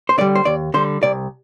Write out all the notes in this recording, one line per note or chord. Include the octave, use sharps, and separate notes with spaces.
C5
D3 G3 D5
C5
D#2 D5
D3 G3 C5
C2 D5